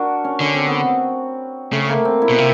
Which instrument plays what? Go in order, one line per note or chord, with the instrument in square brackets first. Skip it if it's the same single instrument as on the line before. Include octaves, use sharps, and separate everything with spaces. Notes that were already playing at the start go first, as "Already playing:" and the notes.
Already playing: [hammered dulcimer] D4 F#4 A#4
C#4
[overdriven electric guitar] D3 [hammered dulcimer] C#4
[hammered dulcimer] C4
B3
C4
[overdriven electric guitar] C#3 [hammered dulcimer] A3
[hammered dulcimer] A#3
C4
E4
[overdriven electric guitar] B2
[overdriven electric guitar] C3 [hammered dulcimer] F4